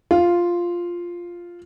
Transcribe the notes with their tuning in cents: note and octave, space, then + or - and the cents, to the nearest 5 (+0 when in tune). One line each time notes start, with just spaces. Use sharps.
F4 +0